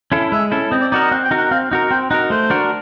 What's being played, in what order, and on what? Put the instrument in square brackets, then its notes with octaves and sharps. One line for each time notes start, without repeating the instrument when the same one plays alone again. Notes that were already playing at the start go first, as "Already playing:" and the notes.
[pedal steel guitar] C#4 E4 A4
[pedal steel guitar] G#3 [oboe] E5
[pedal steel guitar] C#4 E4 A4
[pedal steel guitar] C4 [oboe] D#5
[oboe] D5
[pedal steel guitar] D#4 F#4 A#4 [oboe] D5
[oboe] D#5
[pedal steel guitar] C4 [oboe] F#5
[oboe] G5
[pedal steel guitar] D#4 F#4 A#4
[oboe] F#5
[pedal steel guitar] C4 [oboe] F5
[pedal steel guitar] D#4 F#4 A#4
[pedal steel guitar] C4 [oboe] G5
[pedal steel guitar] D#4 F#4 A#4 [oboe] F#5
[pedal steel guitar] A3 [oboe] C5
[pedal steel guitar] D4 F#4 A#4